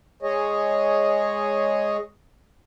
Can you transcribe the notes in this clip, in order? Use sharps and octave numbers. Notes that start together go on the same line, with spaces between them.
G#3 G#4 C#5 D#5